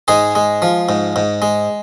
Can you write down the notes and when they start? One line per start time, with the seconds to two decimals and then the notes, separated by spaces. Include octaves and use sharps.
0.08 G#2 G#3 G#4
0.35 G#3
0.62 F3
0.89 G#2
1.16 G#2
1.42 G#3